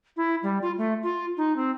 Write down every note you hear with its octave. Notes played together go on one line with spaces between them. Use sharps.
E4
G3
F4
A3
F4
D#4
C4